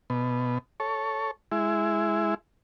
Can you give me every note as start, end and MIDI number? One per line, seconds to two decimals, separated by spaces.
0.10 0.58 47
0.80 1.31 69
0.80 1.31 73
1.52 2.34 56
1.52 2.34 64